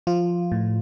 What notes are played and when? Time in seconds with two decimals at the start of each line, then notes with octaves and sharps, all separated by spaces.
0.07 F3 F4
0.52 A2